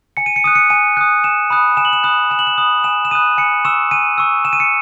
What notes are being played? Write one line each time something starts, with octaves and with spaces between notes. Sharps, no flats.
G#5 C#7
D#7
C#7
D#6 F#6 D#7
C#7
G#5 D#7
D#6 F#6
G#5 E7
B5 D#6 F#6
G#5 E7
F#7
E7
B5 D#6 F#6 E7
G#5 E7
F#7
E7
B5 D#6 F#6
G#5 E7
E7
B5 D#6 F#6 D#7
G#5 C#7
C#6 E6 E7
G#5 D#7
C#6 E6
G#5 E7
D#7
C#7